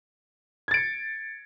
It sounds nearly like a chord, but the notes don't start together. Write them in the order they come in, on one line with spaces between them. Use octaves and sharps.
G#6 A6 D7 C#7